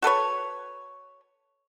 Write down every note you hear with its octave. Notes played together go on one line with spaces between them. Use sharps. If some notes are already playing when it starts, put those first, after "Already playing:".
F#4 A4 B4 C#5